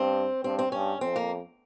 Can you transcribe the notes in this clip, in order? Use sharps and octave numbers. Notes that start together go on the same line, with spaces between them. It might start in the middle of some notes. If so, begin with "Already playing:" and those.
Already playing: G2 C4
G2 C4
C4
G2 C#4
F2 C4
A#3